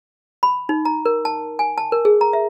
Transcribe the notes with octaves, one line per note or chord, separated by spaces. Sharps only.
B5
D#4
A#5
A#4
A5
G#5
A5
A#4
G#4
A#5
E5